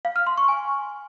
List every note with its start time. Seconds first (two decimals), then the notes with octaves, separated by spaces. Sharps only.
0.05 F5
0.16 F6
0.27 C6
0.37 C#6
0.48 G#5